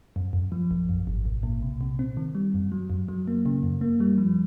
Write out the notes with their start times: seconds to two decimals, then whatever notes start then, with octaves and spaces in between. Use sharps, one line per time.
0.16 F#2
0.33 F#2
0.52 F3
0.71 A#1
0.89 F#2
1.07 G#1
1.25 B1
1.43 A#2
1.62 C3
1.81 C3
1.99 C4
2.17 D#3
2.35 G3
2.54 F#2
2.72 F#3
2.90 F#2
3.08 F#3
3.27 A#3
3.46 C#3
3.63 F#2
3.81 A#3
4.00 G3
4.18 F3